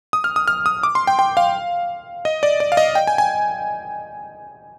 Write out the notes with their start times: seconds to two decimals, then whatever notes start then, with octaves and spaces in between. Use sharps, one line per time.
0.13 D#6
0.24 F6
0.36 D#6
0.48 F6
0.66 D#6
0.83 D6
0.95 C6
1.07 G5
1.19 G5
1.37 F5
2.25 D#5
2.43 D5
2.60 D5
2.72 F5
2.77 D#5
2.95 G5
3.07 G#5
3.18 G#5